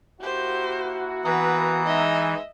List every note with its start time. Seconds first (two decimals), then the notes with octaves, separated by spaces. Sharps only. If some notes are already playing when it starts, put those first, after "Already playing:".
0.21 A#3 E4 F#4 G4 C5
1.25 E3 B3 B4 A#5 D#6
1.86 G#3 D#4 D#5 E5